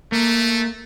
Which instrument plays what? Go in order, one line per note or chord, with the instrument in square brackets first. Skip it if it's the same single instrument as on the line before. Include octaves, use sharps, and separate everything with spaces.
[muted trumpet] A3 [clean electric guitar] A#3